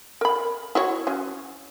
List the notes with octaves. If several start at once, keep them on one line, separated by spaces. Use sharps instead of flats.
A#4 B5
E4 F#4 C#5
F#3 C#4